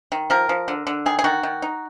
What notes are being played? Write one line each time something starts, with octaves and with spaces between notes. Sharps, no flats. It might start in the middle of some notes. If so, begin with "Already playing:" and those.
D#3
F3 A#4
F3
D3
D3
D#3 G#4
G#4
D#3 F#4
D#3
D#4